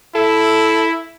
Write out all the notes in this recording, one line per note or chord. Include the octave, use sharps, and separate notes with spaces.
E4 A4